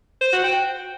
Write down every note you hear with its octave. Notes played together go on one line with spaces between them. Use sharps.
C5
F#4
G5